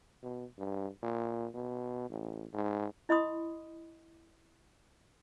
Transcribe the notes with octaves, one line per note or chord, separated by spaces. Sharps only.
B2
G2
A#2
B2
A1
G#2
E4 D#5 B5 C6 D#6